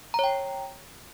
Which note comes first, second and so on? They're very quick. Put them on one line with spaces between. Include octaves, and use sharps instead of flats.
A#5 C#5 G5